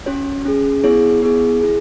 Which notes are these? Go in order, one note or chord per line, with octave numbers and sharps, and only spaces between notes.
C#4 F#4 C#5
C#4 G#4
B3 E4 G#4 C#5
B3 E4 G#4
E4 G#4